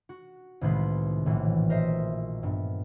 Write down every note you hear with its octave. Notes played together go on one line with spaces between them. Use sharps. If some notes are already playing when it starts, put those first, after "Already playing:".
F#4
C2 A2 D#3 G#3 B4 C6
A#1 A2 E3 F#3
A#4 C5 D#5 E5
G2 B3